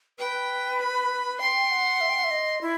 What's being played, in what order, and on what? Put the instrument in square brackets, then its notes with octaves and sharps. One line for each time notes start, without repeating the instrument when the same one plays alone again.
[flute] B4 [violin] G5
[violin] B5
[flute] G5 [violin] C6
[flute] F#5
E5
G5
F#5
E5
D#5
E4